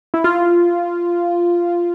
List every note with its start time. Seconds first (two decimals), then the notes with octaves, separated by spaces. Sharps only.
0.14 E4
0.24 F4